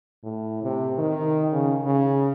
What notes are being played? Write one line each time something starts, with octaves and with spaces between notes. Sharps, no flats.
A2
C3
D#3
C#3
C#3